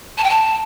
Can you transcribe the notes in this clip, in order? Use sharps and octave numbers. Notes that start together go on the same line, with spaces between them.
A5
G5
A5